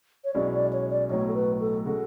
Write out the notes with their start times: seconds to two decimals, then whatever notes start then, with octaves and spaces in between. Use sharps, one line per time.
0.25 C#5
0.34 B1 B2 G#3 C#4 E4 D5
0.53 D5
0.73 C#5
0.91 D5
1.10 B1 A2 F#3 B3 C#5
1.28 A4
1.34 B4
1.60 A4
1.85 C#3 G#3 C#4 F#4 A4